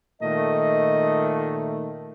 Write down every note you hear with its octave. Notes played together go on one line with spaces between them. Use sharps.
A#2 D#3 A3 D#5